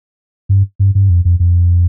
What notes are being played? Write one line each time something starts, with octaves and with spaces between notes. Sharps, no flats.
G2
G2
G2
F2
F2
F2